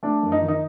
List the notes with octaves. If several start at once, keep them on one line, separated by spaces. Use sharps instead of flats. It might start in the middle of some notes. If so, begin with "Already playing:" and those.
A3 D4
F#2
D#4
D#3
D#4